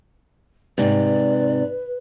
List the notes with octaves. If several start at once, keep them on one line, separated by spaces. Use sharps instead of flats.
G#2 C3 B4 D5